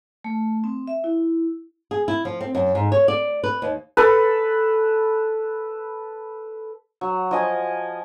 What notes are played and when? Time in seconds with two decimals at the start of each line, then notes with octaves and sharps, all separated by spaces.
0.24 A3
0.64 C4
0.87 E5
1.04 E4
1.91 G#4
2.08 E4
2.25 F3
2.41 C4
2.55 F#2
2.75 G#2
2.92 C#5
3.08 D5
3.44 B4
3.62 D#2
3.97 A4 B4
7.01 F#3
7.31 F3 D#5 G#5